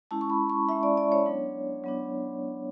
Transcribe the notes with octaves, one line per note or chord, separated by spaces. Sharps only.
G#3 C#4 E4 A5
C#6
B5
C#6
G#3 C#4 E4 E5
D5
D5
C#5
F#3 B3 D4
F#3 B3 D4